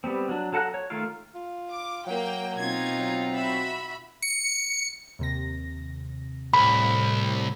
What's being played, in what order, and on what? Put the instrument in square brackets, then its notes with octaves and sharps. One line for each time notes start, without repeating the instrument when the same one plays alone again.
[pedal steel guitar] G3 B3 C4
F#3 D4
F#3 A4 F#5 A#5 F#6
C#5
D#3 A3 F4 A#4 F5
[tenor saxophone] F4
[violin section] D6
[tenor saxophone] F#3 [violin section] A#3 G5
[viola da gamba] B2 D#4 F4 [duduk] C4 [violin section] G#6
[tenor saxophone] F#3
[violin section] F#4 E5 B5
[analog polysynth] C#7
[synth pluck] D#2 C3 A#6
[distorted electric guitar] C2 [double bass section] A2 [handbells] B5